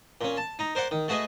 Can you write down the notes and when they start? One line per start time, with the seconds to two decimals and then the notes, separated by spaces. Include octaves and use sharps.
0.21 A#2 C#4
0.37 A5
0.59 D#4 A#5
0.75 A#4 C5 D5 F#5
0.91 D#3
1.08 A3 F#4 G#4 B4 D#5